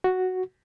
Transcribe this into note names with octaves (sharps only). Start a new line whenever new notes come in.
F#4